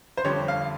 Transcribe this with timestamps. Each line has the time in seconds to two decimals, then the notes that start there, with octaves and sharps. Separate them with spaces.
0.17 C5
0.24 F2 D3 G3 C#5
0.48 F5